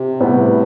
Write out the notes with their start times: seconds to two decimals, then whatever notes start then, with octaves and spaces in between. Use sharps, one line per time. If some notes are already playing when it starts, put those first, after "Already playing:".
Already playing: C3
0.20 A2 G3 B3